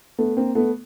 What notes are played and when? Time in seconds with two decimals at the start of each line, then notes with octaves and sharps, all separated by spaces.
0.19 A3 B3
0.37 A#3 C4
0.55 A3 B3